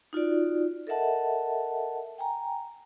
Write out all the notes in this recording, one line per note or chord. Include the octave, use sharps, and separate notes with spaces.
D#4 F4 F#4 D5
A4 A#4 D#5 E5 F#5 A5
G5 G#5 A#5